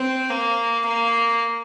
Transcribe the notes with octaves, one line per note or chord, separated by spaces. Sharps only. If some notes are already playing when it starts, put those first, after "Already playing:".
Already playing: C4
A#3
A#3